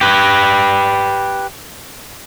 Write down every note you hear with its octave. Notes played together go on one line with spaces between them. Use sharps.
G4 B4